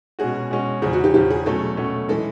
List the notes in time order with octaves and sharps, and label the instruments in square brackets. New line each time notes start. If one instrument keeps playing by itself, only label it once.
[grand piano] B2 G#3 C#4 F#4 [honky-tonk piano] G#4
[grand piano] B2 G#3 C#4 F#4
[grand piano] E2 C#3 F3 [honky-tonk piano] G#4
[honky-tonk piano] F#4
G4
[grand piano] E2 C#3 F3 [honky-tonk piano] G4
[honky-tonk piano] G#4
[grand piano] B2 F#3 A3 C#4 [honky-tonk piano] A4
[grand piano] B2 F#3 A3 C#4
[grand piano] E3 G#3 [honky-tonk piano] A4